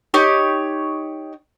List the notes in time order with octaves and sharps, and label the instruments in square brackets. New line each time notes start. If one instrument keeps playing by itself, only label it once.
[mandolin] D#4 G4 C#5